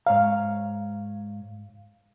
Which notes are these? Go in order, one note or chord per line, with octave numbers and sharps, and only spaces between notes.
G#2 C#5 F5 A#5